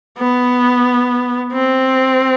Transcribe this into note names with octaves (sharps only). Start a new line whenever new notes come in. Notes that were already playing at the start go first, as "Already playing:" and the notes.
B3
C4